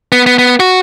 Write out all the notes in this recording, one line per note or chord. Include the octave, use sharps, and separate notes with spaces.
B3
B3
B3
F#4